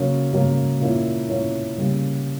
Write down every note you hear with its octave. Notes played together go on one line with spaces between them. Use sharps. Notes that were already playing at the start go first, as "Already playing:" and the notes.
Already playing: C#3 F#3 A#3
C#3 F#3 A#3
A#2 A#3 C#4 E4
A#2 A#3 C#4 E4
C#3 G3 A#3